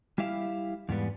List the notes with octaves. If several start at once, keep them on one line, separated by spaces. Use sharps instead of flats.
G3 E4 G4 E5 F5
E2 G#2 G3 B3